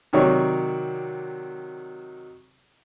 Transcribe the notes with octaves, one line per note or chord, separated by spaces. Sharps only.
C3 D#3 F#3 C#5 D5 C#6